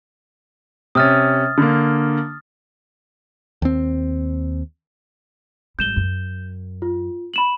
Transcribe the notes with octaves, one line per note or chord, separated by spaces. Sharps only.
C3 C#4 D#6 F6 A6
D3 A#3
D#2 C4
G#1 G3 G6 E7 G7
F#2
F4
B5 E7 F#7